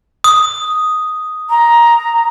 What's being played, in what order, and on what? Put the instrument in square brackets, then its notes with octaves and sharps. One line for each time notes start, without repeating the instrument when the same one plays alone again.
[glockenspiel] D#6
[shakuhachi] A#5